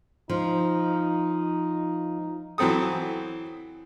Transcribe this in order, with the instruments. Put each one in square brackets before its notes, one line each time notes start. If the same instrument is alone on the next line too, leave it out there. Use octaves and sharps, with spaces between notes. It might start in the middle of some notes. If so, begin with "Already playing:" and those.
[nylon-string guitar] F3 [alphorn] D#4
[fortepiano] E3 F#3 C4 A4 D#6